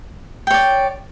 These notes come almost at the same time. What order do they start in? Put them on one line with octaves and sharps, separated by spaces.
G5 C#5 D5